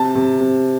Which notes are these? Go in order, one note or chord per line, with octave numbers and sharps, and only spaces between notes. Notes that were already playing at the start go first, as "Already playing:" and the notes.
Already playing: C3 A5
C3
C3